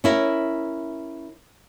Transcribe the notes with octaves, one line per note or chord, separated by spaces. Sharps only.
C#4 E4 A#4